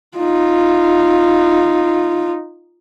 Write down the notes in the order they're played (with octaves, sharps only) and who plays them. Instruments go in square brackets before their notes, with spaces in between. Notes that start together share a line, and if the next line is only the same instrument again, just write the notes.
[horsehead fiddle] D#4 F4